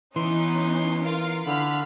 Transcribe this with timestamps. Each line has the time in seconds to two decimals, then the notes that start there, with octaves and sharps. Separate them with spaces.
0.16 E3 B3 C#4 D#4 C6
1.03 F4 A#4 F5
1.46 D3 F5 B5 F6